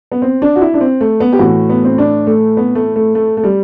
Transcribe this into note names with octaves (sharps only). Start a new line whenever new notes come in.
B3
C4
D4
F#4
E4
D4
C4
A3
B3
G4
A2 E3 F#4
B3
C4
D4
A3
B3
A3
A3
A3
A3
G3